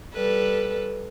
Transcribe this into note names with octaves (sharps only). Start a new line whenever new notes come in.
G3 A4 B4